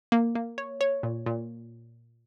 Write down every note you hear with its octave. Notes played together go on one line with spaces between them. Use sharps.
A#3
A#3
C#5
C#5
A#2
A#2